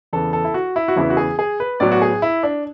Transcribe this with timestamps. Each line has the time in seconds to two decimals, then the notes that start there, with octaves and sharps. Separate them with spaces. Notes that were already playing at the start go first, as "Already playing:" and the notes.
0.13 E2 C#3 E3 B3 A4
0.33 A4
0.44 E4
0.54 F#4
0.76 E4
0.88 F#4
0.96 E2 C#3 E3 B3 E4
1.10 F#4
1.17 G#4
1.39 G#4
1.60 B4
1.80 A2 F#3 B3 D5
1.92 F#4
2.02 G#4
2.22 E4
2.43 D4